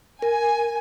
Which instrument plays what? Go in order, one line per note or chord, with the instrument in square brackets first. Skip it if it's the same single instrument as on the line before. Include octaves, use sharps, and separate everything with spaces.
[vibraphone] A#4 [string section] G#5